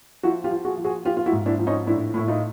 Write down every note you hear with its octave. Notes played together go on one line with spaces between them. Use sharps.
F3 E4 F#4
F4 G4
F3
F#4 G#4
F3
F#4 G#4
F3 F4 G4
F4
E4 F#4
G#2
D4 E4
F3
C#4 D#4
A2 D4 E4
A2 E4
D#4 F4